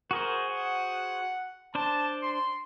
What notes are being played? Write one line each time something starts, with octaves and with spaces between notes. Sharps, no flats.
F#4 G#4 A#4 C5
F#5
D4 C5 D5 A5
C6